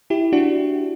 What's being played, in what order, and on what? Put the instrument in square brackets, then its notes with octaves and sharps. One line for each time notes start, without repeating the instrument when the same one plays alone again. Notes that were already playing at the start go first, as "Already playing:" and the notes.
[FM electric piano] E4 G4
D4 F#4